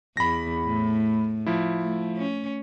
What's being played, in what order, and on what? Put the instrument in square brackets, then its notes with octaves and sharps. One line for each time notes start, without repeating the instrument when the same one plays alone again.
[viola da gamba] E2 [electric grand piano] B5 A#6
[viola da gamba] A2
[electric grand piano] F3 E4
[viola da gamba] A3
C#4